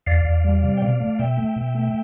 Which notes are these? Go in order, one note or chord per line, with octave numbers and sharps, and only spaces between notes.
E2 D5 F5
E2
G3
C3
G5
B2 D5 F5
A3
B2 E5 G5
A3
B2
A3